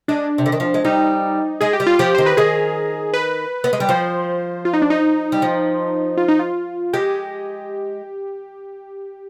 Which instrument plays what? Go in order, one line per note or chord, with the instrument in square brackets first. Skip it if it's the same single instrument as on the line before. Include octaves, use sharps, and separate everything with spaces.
[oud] G#3 [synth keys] D4
[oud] C3
D3
D#3
F3
G#3
[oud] G3 [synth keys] D#4
[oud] G#3 [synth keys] G#4
[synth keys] G4
[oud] G3
[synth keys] F4
[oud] F3 [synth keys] G4
[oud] D#3 [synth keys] C5
[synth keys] B4
[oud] D#3 [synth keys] G#4
[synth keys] B4
[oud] B3
G#3
G3
[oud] F3 [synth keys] C5
[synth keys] F4
D#4
D4
D#4
[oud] G3
F3
[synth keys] F4
D#4
F4
[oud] G#3 [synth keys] G4